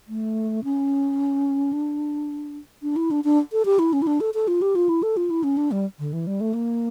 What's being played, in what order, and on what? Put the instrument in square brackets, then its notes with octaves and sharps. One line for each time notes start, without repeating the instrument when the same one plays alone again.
[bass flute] A3
C#4
D4
D4
E4
D4
D4
A4
G4
E4
C#4
E4
D4
A4
A4
F4
G4
F4
E4
A4
F4
E4
C#4
D4
G3
D3
E3
G3
A3
A#3